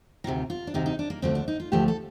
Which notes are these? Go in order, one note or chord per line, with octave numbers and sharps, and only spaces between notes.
D2 C3 D#3 F4
F4
D4
D2 C3 D#3 D#4
D#4
D4
A#3
D2 D3 F3 A3 C4
D4
D#4
F4
D2 D3 F3 A3 G4
A4